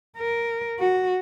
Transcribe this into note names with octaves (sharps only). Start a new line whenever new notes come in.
A#4
F#4